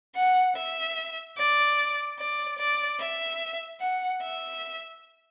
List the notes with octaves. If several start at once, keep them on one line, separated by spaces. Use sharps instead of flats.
F#5
E5
D5
D5
D5
E5
F#5
E5